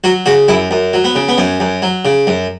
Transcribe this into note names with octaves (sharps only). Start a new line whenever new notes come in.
F#3 F#4
C#3 F#4
F#2 E4
F#2
F#3
B3
C#3
B3
F#2 C#4
F#2
F#3
C#3
F#2